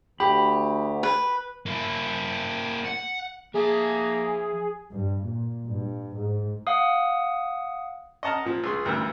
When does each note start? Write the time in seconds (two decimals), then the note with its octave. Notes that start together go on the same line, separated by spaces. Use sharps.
0.20 D2 G4 B5
1.03 B4
1.66 A#3 E4
2.85 F#5
3.54 F3 A#3 G#4 E5 A5
4.91 G2
5.27 A#2
5.69 G2
6.16 G#2
6.67 F5 F#5 D#6
8.23 D#5 F#5 A5 A#5 F6
8.45 A#2 F3
8.64 C#2 G#4 C6
8.85 D2 G2 E3 A#4 E6